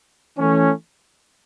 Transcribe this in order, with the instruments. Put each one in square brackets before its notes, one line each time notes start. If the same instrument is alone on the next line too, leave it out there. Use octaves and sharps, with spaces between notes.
[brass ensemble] E3 A3 C#4